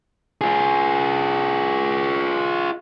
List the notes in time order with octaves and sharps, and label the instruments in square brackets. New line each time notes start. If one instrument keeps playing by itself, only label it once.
[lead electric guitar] F4 G#4